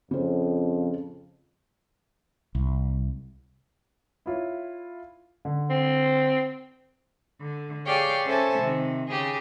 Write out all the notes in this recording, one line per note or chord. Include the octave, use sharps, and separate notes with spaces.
F2 C#3 C5
C2
E4 F4 C#5
D3
C4
D3
G4 G#4 C#5 D5 F5 G5
C#4 A4 C5 E5 G#5 A5
C3 D#3
C#3 G4 G#4